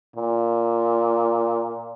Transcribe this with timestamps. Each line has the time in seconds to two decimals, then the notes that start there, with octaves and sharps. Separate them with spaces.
0.16 A#2